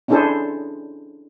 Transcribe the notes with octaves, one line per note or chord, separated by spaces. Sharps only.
C#4 D4 E4 G#4 A4 C5